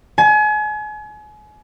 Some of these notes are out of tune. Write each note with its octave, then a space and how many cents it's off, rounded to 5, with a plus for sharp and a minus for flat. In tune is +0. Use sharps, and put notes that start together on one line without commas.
G#5 +35